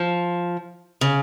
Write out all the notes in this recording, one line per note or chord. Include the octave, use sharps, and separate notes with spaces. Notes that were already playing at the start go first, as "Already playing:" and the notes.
Already playing: F3
C#3